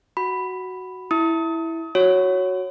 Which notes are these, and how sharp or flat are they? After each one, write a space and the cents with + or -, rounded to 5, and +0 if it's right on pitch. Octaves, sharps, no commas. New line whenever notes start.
F#4 +5 B5 +5
E4 -5 D#6 +35
F#4 +0 C#5 +0